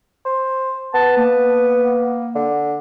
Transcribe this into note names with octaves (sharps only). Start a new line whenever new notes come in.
C5
B3 A5
A#3
D3